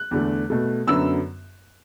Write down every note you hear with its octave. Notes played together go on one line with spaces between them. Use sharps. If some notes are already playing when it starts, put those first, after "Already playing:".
Already playing: F#6
E2 D3 A3
B2 A3
F#2 D3 F#3 B3 E6